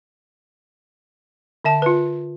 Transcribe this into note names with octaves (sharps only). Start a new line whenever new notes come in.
D3 E5 A5
F4 B4